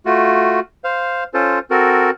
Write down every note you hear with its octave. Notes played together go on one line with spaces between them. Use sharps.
A3 F4 F#4
C5 F5
C#4 F4 A4 C5
C4 F#4 A4 A#4